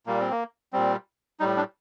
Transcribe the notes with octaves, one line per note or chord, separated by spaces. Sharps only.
A#2 G3 A#3
C4
A#3
A#2 G3 C4
A2 G3 D#4
D4